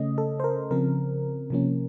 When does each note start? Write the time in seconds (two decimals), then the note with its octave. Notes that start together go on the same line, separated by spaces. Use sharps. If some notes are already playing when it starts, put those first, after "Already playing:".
Already playing: C#3 A3 C#4 D#5
0.18 A4
0.40 C5
0.44 A#4
0.71 C#3 F3 C4 A#4
1.50 C3 F3 A#3 C#4